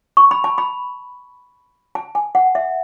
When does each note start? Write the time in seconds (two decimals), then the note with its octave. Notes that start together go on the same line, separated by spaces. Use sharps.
0.17 C#6
0.31 B5
0.44 A5
0.58 B5
1.95 A5
2.15 G#5
2.35 F#5
2.55 E5